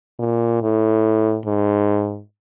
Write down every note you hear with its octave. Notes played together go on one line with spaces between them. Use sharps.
A#2
A2
G#2